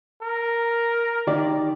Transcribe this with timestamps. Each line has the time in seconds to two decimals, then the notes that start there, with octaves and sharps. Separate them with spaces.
0.22 A#4
1.27 D#3 G4 D5